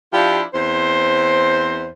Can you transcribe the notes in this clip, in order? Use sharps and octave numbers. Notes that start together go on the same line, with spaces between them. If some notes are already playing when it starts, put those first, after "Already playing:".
F3 D4 E4 F4 G4
E2 C4 C5